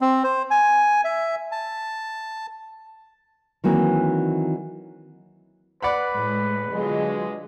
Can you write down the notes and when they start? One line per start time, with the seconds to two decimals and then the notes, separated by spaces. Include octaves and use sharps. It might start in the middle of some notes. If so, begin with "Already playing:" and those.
0.01 C4
0.24 C5
0.51 G#5
1.05 E5
1.52 A5
3.64 D#3 E3 F#3 A#3 C4
5.83 B4 D5 F#5 B5
6.14 A2 G#3
6.72 B2 D3 F#3 G#3 F4